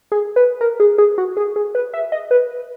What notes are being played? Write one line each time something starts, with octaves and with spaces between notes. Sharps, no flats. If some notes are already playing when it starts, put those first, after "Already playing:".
G#4
B4
A#4
G#4
G#4
F#4
G#4
G#4
B4
E5
D#5
B4